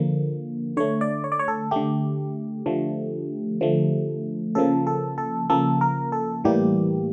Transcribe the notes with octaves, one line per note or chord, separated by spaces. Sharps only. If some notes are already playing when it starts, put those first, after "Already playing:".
Already playing: D3 F3 A#3
D3 A3 C#5
D5
C#5
D5
C#5
A4
D3 A3 G4
D3 F3 A3
D3 F3 A3
C#3 F3 A#3 A4
A4
A4
C#3 F3 A#3 A4
A#4
A4
A2 E3 G3 A#3 G4